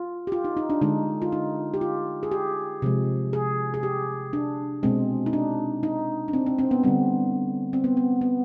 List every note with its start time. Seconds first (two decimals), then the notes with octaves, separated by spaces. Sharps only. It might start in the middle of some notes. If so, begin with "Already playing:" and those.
Already playing: F4
0.27 G4
0.32 F4
0.44 D#4
0.57 D#4
0.70 D4
0.81 D3 G#3 D#4
1.22 F4
1.32 D#4
1.74 G4
1.81 F4
2.23 G#4
2.32 G4
2.82 C3 F3 G#3
3.33 G#4
3.74 G#4
3.83 G4
4.33 D4
4.83 B2 G#3 C4
5.26 D#4
5.33 D4
5.83 D#4
6.28 D4
6.33 C4
6.46 C4
6.59 C4
6.71 B3
6.83 D3 G3 C4
7.73 C4
7.84 B3
7.97 B3
8.21 B3